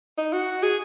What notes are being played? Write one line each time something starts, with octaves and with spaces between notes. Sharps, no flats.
D#4
F#4
G#4